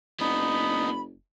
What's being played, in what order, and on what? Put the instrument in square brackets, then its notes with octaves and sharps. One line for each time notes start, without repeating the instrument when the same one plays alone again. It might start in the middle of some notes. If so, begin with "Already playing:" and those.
[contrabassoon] F#1 [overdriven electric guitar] B3 D4 [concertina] D#4 [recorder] B5